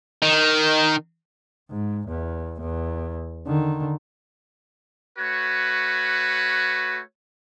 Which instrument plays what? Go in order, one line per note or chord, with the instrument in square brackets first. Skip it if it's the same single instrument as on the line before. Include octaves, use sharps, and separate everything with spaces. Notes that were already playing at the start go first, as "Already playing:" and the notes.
[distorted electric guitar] D#3
[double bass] G#2
E2
E2
D3 D#3
[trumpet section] A3 F#4 B4 C#5